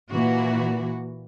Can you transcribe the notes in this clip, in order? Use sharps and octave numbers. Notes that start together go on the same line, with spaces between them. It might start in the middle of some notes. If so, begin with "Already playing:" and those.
A#2 E3 A#3 F#4